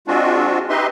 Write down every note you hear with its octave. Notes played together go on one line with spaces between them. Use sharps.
G#3 C4 D4 F4 F#4
D#4 G4 B4 D#5 E5 C6